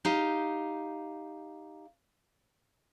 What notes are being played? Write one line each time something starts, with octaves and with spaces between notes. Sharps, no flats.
D#4 G4 F5